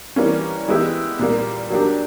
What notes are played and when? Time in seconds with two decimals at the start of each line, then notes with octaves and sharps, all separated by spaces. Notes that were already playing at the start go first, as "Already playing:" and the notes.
0.16 E3 G3 A#3 C#4
0.68 E3 G#3 B3 E4 G4
1.19 A#2 G3 A#3
1.70 F#3 A#3 D4 G4